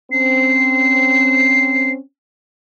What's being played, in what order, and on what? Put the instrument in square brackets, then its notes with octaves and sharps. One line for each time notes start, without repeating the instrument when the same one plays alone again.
[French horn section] C4 C#4 [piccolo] C7